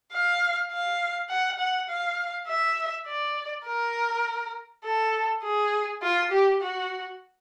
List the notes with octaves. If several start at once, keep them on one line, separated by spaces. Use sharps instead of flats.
F5
F5
F#5
F#5
F5
E5
D5
A#4
A4
G#4
F4
G4
F#4